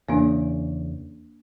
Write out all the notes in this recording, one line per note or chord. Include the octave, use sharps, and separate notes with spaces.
E2 C#3 A#3 D4